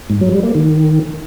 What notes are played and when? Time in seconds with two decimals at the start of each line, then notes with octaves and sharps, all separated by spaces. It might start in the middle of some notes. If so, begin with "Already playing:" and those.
0.10 G#2
0.21 F#3
0.32 G3
0.43 A#3
0.55 D#3